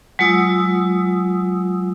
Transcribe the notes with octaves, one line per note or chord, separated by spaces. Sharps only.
F#3 G#3 F4 D#6 E6